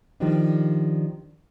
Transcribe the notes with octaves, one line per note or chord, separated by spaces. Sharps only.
D#3 F3 G3 D4 D#4